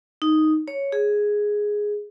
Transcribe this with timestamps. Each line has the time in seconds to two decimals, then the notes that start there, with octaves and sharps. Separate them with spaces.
0.22 D#4
0.68 C#5
0.92 G#4